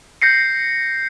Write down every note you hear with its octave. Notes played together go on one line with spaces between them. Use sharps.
G6 A#6 C7 C#7